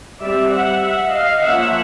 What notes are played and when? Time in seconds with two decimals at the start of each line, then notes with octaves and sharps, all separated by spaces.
0.21 G3 C4 D5 E5
0.51 E5 F#5
0.81 E5 F#5
1.12 D#5 F5
1.42 F3 A#3 C#4 E5 F#5